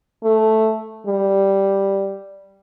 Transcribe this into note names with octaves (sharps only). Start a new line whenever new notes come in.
A3
G3